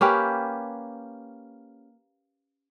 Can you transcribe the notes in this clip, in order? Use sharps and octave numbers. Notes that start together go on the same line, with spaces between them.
A#3 C#4 G4 B4